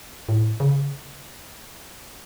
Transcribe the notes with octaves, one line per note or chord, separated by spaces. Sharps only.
A2
C#3